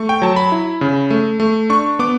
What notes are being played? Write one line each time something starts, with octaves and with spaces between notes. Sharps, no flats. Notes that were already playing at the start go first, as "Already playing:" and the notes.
Already playing: A3 C#6
G5
F#3 A5
B5
E4
C#3
A3
A3
D4 C#6
B3 D6